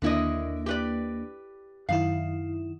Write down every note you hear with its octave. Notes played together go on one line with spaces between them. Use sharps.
D#2 D3 A#3 D4 E4 D#5
G4 B4 D5
F#2 D#3 E4 F5